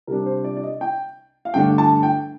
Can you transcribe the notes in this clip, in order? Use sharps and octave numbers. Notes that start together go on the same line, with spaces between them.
C3 G3 D4 A#4
C5
D5
D5
D#5
G5
F5
G2 D3 A3 D4 G5
A5
G5